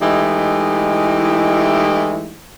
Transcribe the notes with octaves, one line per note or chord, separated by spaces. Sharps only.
E3 G#3 A3 D#4 E4 G4